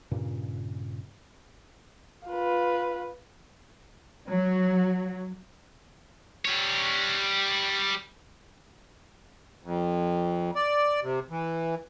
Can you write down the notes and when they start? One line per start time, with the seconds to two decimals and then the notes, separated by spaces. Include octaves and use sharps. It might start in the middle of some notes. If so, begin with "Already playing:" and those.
0.11 G2 A#2 C#3
2.27 F4 B4
4.28 F#3
6.45 G3 C#5
9.63 F2
10.55 D5
11.02 C3
11.30 E3